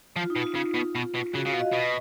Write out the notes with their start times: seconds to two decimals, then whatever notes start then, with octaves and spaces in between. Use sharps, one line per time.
0.16 F3 F4
0.30 D#4
0.36 B2
0.42 F4
0.55 C#3
0.75 B2
0.95 B2
1.14 B2
1.33 C#3 F#4
1.45 C#3 F5
1.53 B2
1.59 D#5
1.72 B2 D#5